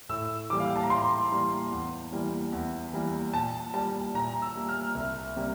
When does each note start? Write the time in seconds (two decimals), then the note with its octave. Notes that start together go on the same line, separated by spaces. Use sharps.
0.09 A2 E6
0.50 E3 G3 A#3 D6
0.60 F5
0.68 G5
0.76 A5
0.83 A#5
0.90 A2 C6
1.32 E3 G3 A#3
1.72 E2
2.12 E3 G3 A#3
2.53 E2
2.93 E3 G3 A#3
3.34 A#2 A5
3.74 G3 A#3 A5
4.14 A#2 A#5
4.42 E6
4.55 G3 A#3
4.69 F6
4.95 C2
5.36 C3 G3 A#3